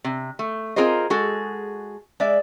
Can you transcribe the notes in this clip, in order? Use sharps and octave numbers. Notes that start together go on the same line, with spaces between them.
C3
A3
C4 F4 G#4 A#4 C5 D#5
G#3 F#4 G#4 A4
G#3 D5 E5